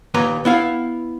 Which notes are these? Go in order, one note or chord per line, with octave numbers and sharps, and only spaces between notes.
D#2 A#2 B4 A#5
B3 E4 F5